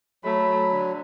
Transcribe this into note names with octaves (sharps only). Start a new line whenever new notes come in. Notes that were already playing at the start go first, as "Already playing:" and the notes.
F#3 A3 B5
D3